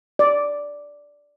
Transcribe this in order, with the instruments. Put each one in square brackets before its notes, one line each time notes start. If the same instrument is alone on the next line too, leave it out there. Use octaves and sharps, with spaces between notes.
[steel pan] D5